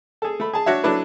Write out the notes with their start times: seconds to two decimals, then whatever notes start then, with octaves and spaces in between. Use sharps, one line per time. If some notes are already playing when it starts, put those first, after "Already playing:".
0.22 G#4 A4
0.40 A3 B5
0.53 G#4 A5
0.66 D4 F#4 C#5 E5
0.83 F#3 A3 D4 E4 B4